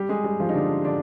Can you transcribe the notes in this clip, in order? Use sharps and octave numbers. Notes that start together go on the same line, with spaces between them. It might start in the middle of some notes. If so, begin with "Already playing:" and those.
Already playing: G3 G4
G#3 G#4
G3 G4
F3 F4
D#4
D3 D4
D3 D4